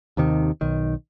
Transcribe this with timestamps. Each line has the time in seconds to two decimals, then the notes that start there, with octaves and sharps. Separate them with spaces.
0.17 D#2 C3 D#3
0.61 B1 D#3